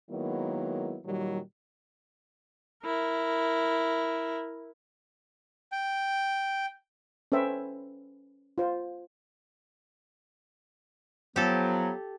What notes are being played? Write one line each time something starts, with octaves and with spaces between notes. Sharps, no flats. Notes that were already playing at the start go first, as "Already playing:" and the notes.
D#3 F#3 G#3 A#3 B3 E4
A#2 D#3 F#3 G3
E4 A#4
G5
C#4 A4 B4 C5 E5 G5
F4 C5
F3 F#3 B3 G4 A4